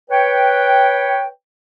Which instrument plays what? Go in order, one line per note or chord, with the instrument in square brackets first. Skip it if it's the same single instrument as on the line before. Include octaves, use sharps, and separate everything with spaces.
[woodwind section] B4 C#5 G5